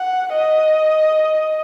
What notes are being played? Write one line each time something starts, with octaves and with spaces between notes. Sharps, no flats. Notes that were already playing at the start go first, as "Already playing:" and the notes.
Already playing: F#5
D#5